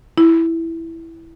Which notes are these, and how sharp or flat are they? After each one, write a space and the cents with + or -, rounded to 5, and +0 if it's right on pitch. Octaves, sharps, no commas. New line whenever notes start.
E4 +0